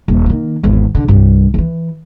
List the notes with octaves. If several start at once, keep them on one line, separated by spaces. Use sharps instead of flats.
D#1
D#3 A#3
G#1 E2
D3
C2 G2
D#3 E3